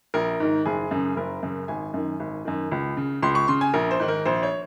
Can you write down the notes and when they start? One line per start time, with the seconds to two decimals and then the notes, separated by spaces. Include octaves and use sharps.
0.14 A#1 A#4
0.40 G#2 D#3
0.66 F#1 G#4
0.91 F#2 C#3
1.16 F#1 A#4
1.43 F#2 C#3
1.68 G#1 G#5
1.94 F#2 D#3
2.20 G#1
2.45 F#2 D#3
2.71 C#2
2.97 C#3
3.22 C#2 C6
3.35 C#6
3.48 C#3 C6
3.61 G#5
3.74 A#1 A#4
3.91 C5
3.99 G#2 D#3
4.08 A#4
4.25 A#1 C5
4.43 C#5